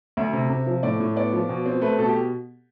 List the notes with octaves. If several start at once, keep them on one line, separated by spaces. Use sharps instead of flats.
D2 E5
C3
C3
F3
A2 D5
A2
B3 D5
F3
B2
C4
A3 B4
B2 A4
G4